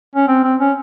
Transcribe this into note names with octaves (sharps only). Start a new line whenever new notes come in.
C#4
C4
C4
C#4